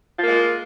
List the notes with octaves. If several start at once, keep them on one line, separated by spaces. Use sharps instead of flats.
G#3 A#3 F4